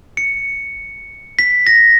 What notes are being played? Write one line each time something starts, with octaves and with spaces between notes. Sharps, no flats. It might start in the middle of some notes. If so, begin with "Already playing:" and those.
C#7
B6
A#6